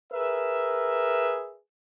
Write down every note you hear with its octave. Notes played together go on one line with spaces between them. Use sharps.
G#4 A#4 B4 E5